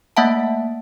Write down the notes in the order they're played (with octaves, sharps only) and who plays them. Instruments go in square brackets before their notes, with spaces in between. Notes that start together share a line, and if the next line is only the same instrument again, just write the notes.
[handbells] A3 A#3 E5 F#5 A5